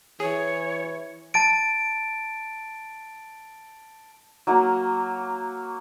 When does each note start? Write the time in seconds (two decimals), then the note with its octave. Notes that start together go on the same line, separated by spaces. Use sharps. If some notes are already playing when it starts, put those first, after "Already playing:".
0.20 E3 G#4 C#5
1.34 A5 A6 D7
4.47 F#3 A#3 F#4